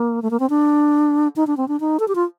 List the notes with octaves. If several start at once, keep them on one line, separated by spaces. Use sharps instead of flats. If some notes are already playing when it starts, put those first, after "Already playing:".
Already playing: A#3
A3
A#3
C4
D4
D#4
D4
C4
D4
D#4
A4
G4
F4